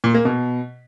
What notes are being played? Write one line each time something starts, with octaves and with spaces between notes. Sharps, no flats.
A#2
A#3
B2